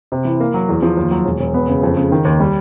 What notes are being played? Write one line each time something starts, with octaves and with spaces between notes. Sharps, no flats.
C3
E3
A#3
F#3
E2
F3
D#2
F#3
E1
E1
B3
C#3
F2
C#3
D#3
D#2
G3